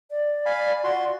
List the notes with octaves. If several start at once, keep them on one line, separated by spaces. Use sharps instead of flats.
D5
F5 G#5 B5
F4 F#4 C6